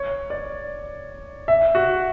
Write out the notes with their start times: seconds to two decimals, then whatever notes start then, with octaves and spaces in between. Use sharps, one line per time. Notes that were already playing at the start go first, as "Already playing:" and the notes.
Already playing: C#5
0.30 D5
1.48 E5
1.75 F#4